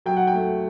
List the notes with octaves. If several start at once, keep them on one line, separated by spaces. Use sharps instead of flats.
F#3 G5
F#5
G5
A3